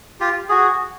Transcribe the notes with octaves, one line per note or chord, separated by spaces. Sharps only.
F4 G4
F#4 G#4